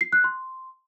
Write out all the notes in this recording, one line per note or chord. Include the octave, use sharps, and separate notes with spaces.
C7
F#6
C6